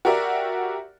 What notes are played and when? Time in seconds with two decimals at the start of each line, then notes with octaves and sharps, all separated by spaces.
0.05 F#4 G4 A#4 D5 E5